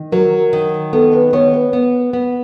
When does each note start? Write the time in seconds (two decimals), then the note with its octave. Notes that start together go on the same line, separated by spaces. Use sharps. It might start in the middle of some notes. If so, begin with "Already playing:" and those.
Already playing: D#3
0.12 F#3 A#4
0.53 D#3
0.93 B3 A4
1.13 B4
1.33 B3 C#5
1.53 B4
1.73 B3
2.13 B3